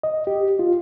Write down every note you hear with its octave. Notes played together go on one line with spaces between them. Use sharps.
D#5
G4
F4